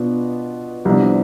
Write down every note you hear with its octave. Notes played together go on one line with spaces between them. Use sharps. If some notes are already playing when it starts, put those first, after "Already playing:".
Already playing: B2 B3 D4 F4
C2 C3 F3 B3 D4